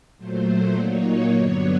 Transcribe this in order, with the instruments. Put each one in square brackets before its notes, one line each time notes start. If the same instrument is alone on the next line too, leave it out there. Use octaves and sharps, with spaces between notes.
[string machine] A#2 F#3 A3 C5
A#2 F#3 A#3 D#4 C#5
G2 D3 F#3 B3 D4